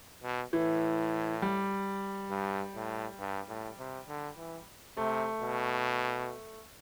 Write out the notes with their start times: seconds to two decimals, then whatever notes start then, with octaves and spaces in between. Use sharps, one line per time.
0.23 B2
0.53 A2 E3
1.42 G3
2.30 G2
2.75 A2
3.19 G2
3.48 A2
3.79 C3
4.08 D3
4.37 E3
4.97 C3 A3
5.42 B2